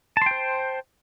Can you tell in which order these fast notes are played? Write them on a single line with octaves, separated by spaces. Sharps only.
A5 C6 G5 C5